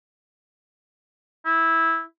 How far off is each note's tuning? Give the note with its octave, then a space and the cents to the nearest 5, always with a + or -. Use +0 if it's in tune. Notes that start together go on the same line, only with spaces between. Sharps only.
E4 -10